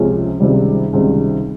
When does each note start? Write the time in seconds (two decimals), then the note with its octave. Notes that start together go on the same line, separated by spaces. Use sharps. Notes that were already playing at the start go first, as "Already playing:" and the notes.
Already playing: C#2 C3 F3 G#3 C#4
0.40 C#2 C3 D#3 G3
0.93 C#2 C3 D#3 G3